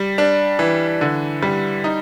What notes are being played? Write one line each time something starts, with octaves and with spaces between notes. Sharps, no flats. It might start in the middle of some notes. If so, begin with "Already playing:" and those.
Already playing: G3
D4
E3
D3
G3
D#4